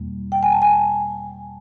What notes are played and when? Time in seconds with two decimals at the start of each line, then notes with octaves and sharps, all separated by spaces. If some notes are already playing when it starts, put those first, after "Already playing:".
Already playing: E2 B2 G3 A#3
0.32 G5
0.43 G#5
0.52 A5
0.62 G#5